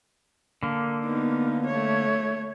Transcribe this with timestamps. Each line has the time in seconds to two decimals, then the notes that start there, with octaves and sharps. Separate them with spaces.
0.63 D3 A#3
1.05 B3 D#4
1.67 A3 C#5